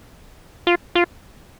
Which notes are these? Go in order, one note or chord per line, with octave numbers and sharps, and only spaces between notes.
F4
F4